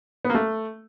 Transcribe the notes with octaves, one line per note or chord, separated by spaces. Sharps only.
B3
A#3
A3